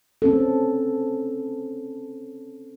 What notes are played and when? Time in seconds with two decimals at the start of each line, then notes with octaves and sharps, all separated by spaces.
0.22 C4 C#4 A4